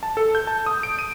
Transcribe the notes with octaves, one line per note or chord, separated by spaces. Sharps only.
A5
A4
G6
A5
D#6
D7
D#7